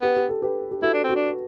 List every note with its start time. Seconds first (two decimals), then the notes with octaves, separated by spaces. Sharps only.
0.02 B3 G4 B4
0.17 G4
0.29 A4
0.42 G4 B4
0.71 G4
0.82 E4 F#4 A4
0.94 D4
1.04 C4
1.09 F#4
1.16 D4